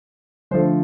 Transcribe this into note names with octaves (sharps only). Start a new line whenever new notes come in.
D3 F3 A3 C5